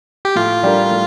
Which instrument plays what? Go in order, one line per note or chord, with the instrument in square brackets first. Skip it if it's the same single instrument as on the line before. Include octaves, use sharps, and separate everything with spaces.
[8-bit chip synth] G4
[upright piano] A2 [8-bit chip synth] F4
[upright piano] G3 D4 G4 A#4
A2